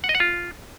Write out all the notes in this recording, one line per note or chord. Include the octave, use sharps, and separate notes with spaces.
F#5
D#5
F#5
F4